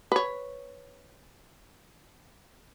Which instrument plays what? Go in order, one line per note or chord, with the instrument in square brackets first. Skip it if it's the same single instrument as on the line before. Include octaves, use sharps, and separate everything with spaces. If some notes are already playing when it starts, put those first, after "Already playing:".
[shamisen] B4 C#5